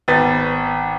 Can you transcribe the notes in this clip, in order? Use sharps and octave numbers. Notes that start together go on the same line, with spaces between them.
G#1 B3 A6